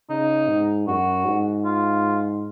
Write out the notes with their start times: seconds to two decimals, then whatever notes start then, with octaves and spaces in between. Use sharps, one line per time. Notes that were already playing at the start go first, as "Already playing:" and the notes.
0.10 C#3 D#4
0.48 G#2
0.87 F#2 F#4
1.25 G#2
1.64 F4